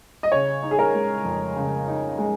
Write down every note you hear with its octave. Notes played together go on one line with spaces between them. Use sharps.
D#5
C#3 C#5
D#4
G#4
A#4
G#3
F2
C#3
D#4
G#3